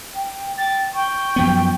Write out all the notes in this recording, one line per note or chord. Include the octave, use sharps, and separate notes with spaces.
G5
G5 A6
G5 C#6
F#2 F3 B3